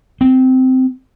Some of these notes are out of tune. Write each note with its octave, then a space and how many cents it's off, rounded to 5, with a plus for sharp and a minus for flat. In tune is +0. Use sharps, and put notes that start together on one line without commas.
C4 -15